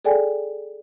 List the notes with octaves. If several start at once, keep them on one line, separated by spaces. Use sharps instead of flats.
G#4 A4 D5 G5 G#5